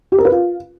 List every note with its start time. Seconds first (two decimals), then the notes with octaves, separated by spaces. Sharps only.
0.12 G4
0.18 A#4
0.25 B4
0.31 F4